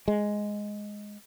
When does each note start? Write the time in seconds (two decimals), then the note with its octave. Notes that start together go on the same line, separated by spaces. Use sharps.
0.08 G#3